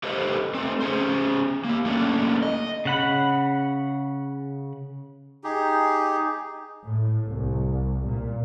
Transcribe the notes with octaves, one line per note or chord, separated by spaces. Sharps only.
G4 A4 B4 C5 D#5
A3 C4
C#4 G#4 C5
A#3 G4
A3 A#3 C#4 D4
D#5
C#3 F#5 B5
D#4 G4 G#4
A2
C2
A#2